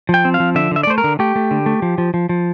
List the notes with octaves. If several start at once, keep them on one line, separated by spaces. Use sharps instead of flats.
F3 G5
C4
F5
F3
D3 E5
D3 E5
D5
A3 C5
A#4
D3
A3 G4
A3
D3
A3
F3
F3
F3
F3